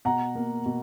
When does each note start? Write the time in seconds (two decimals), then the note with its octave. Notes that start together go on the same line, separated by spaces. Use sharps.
0.05 B2 F#5 A#5
0.35 A#3
0.66 B2